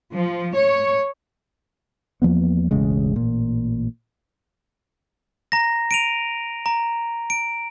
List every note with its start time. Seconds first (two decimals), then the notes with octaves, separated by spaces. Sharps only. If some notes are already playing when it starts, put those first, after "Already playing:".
0.13 F3
0.55 C#5
2.22 E2 F3 A#3 B3
2.71 E1 A1 C#3 G#3
3.16 A1 A#2
5.52 A#5 A#6
5.91 D7 D#7 F7
6.66 A#5
7.30 D7